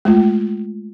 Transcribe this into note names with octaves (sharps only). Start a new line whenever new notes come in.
G#3 A3 F4